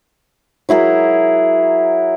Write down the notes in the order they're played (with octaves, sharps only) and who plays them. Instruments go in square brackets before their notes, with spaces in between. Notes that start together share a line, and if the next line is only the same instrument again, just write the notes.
[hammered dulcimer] F#3 E4 G#4 A#4